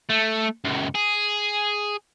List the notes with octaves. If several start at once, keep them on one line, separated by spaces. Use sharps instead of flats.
A3
C#2 F#2
G#4